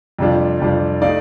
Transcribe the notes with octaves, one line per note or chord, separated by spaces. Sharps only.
F2 C3 G3 D4 F4
F2 C3 G3 D4 F4
A3 D#4 D5 F5